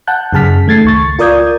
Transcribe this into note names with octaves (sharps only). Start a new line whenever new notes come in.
F#5 A5 F#6 G6
F#2 C#3 G#4 A5 F6 B6
D#3 A3 G#6 A6 C7
C#2 C#6 A6
F4 A#4 D5 D#6 G6 G#6